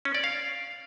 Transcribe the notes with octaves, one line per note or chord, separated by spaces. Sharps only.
C#4
D5
F5